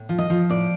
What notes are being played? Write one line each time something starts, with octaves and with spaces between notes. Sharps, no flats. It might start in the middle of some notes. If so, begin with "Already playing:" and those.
Already playing: A2
F3
D#5
F3
A2 D5